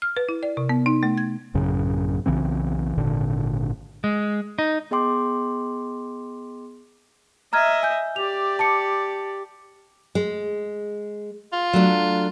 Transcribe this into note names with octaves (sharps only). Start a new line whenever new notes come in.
F6
B4
E4
D5
C3
B3
D#4
A3
G#6
A1 F#2 C#3
B1 C#3 E3 C4
G#1 A#2 D3
G#3
D#4
B3 G#4 D#5 G5 C6 D6
D#5 E5 A#5 F6 G#6
G#5 G6
G4 D5 F7
A5 D6 C#7
G#3
F4
F#3 A3 D4